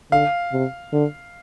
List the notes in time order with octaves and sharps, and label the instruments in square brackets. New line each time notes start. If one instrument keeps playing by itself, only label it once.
[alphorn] D3 [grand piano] F5
[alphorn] C3
D3